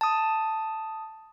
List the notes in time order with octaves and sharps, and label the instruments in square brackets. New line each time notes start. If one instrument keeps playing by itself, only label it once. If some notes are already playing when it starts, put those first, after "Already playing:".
[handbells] A5 D#6